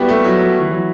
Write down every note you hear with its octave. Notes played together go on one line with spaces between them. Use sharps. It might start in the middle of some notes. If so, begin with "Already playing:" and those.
Already playing: G3 B3 E4 F#4 G4
A3
F#3
F#3
E3
F#3